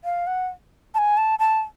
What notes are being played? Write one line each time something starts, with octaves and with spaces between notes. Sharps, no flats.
F5
F#5
A5
G#5
A5
A5